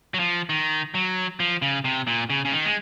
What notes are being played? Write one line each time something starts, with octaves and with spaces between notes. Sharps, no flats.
F#3
F3
D#3
F#3
F3
C#3
C3
A#2
C#3
C#3
D#3
G#3